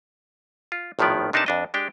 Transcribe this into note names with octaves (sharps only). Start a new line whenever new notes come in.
F4
G#1 A2 D#3 F3 B3 D5
C3 D4 D#4 A#4 B4 A5
F2 D4 D#5
G#3 D4 G4 G5